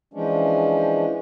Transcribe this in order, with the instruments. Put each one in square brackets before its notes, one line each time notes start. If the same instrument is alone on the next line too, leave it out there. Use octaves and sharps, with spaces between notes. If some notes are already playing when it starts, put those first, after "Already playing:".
[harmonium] E3 F3 G#3 C#4 D4